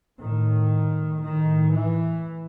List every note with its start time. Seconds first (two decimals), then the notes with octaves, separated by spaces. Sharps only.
0.21 A2 D#3
1.22 A2 D#3
1.73 E3